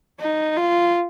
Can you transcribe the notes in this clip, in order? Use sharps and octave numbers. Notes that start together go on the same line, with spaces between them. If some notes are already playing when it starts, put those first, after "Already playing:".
D#4
F4